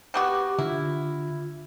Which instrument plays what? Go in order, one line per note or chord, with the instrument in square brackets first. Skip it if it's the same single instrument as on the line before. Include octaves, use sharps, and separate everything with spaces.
[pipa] G3 B3 F#4 [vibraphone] G4 D6
[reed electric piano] D3 [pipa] E4 [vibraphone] F4